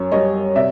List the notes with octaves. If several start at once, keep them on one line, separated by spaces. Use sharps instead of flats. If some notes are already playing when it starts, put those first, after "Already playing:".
Already playing: F#2 C#5
G3 C#5 D#5
C3 D5 E5